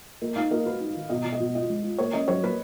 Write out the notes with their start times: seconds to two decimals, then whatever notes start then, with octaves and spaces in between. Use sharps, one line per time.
0.22 A#3 D#5
0.36 D#4 F5
0.51 A#3 D#5
0.66 F#4 B4
0.80 D#4
0.95 D#3
1.10 B2 D#5
1.24 B2
1.33 D#5
1.40 B2
1.55 F4 D#5
1.70 G#3
1.83 F4
1.98 A#3 C#5
2.13 C#4 D#5
2.28 F#3 C#5
2.43 A#3 B4